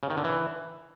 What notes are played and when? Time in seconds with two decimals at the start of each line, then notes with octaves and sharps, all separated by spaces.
0.03 C#3
0.10 D#3
0.17 D3
0.24 E3